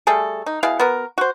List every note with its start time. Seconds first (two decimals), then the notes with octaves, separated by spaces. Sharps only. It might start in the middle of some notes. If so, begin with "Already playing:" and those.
0.07 G3 A3 G#4 A4
0.46 D#4
0.63 B2 E4 G#4 F5
0.80 B3 F#4 A#4
1.18 F#4 C5